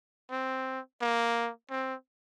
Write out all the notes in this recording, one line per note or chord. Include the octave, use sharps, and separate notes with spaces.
C4
A#3
C4